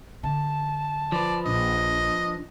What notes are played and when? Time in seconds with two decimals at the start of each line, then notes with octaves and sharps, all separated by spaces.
0.23 D3 A5
1.12 F3 B4 D5
1.46 A#1 D4 D#5